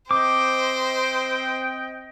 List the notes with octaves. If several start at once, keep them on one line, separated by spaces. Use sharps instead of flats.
C4 C5 D#5 G5 D6